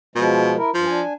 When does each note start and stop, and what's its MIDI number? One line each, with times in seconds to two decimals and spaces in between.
0.16 0.56 47
0.16 0.56 53
0.16 0.56 56
0.57 0.70 64
0.57 0.70 70
0.74 0.86 43
0.74 1.01 53
0.87 1.13 62
0.87 1.13 80